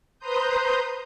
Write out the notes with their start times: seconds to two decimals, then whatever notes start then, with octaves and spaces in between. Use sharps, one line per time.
0.19 B4 C5 A#5 C6 D#6 G6